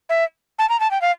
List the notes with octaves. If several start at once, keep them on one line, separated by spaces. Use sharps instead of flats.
E5
A5
A#5
A5
G5
F5